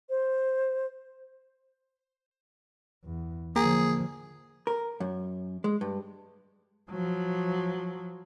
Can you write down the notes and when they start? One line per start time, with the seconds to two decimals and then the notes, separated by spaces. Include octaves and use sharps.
0.10 C5
3.04 E2
3.56 D3 F3 A#3 G#4
4.67 A#4
5.00 F#2
5.64 G#3
5.81 G2
6.90 F3 F#3